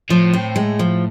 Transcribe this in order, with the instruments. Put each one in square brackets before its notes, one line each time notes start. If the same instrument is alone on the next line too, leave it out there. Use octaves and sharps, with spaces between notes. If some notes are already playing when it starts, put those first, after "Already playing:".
[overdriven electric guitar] A2 [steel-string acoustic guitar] F3
[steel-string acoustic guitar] C4
G#3
F3